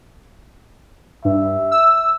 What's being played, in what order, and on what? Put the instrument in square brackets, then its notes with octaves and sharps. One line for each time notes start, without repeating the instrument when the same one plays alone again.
[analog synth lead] G2 [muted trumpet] E5
[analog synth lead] E6